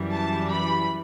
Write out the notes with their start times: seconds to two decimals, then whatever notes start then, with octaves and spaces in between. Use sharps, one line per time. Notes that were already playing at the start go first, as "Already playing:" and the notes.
Already playing: F#2 E3 G3
0.13 A5
0.51 B5